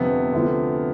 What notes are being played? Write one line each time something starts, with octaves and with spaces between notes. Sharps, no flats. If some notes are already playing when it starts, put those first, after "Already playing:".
Already playing: G1 F2 C3 B3
D2 C3 F3